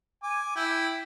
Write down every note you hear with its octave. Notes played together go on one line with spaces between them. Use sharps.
G#5 D6
E4 G5